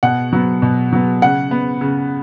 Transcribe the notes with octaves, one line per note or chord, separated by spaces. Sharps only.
B2 F#5
F#3 B3
B2
F#3 B3
C#3 F#5
B3
C#3